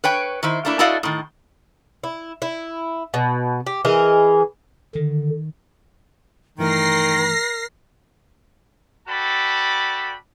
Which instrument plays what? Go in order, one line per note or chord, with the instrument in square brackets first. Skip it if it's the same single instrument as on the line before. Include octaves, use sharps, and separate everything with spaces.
[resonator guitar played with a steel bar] B4 C#5 G5
D#3 E4 C5
A3 A#3 D4 E4
E4 F#4 A4 D5 D#5 F5
A2 D#3
[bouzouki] E4
E4
B2
G4
E3 G#4 A#4 D#5
[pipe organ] D3 [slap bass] D#3
[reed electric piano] G2 E3 A3 [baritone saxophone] D#3 [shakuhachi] A#4 [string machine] A#6 C7
[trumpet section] F#4 A4 D5 G5 A5 B5